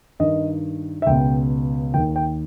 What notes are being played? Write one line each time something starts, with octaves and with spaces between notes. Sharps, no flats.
G2 D#3 D#5
E5
C#2 B2 G5
D#2 D#3 G5
G5